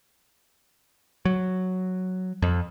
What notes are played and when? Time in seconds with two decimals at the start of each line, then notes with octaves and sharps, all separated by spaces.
1.25 F#3
2.42 F2